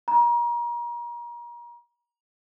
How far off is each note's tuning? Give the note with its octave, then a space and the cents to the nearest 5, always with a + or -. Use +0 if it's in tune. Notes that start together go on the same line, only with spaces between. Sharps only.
A#5 +35